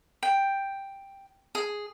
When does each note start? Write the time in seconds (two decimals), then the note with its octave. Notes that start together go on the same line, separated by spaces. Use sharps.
0.23 G5
1.55 G#4